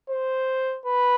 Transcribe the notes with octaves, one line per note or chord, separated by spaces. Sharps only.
C5
B4